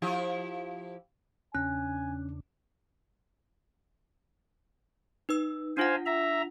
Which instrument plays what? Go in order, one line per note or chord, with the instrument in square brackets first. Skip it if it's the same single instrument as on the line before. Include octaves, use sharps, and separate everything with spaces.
[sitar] F3 E4 G4
[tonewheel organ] E2 C#3 D4 [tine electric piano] C#4 [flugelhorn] G#5 [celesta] F#6
[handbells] D#4 B4 E6
[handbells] D4 F4 F#5 [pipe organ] C5 F5 G#5
[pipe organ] E5 A#5